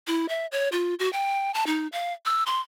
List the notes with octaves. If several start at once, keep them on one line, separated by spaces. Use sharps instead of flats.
E4
E5
C#5
F4
F#4
G5
A5
D#4
F5
E6
C6